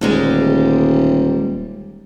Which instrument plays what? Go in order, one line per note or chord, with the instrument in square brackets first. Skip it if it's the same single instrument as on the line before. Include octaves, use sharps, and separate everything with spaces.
[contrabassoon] D#1 [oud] D2 G3 G#3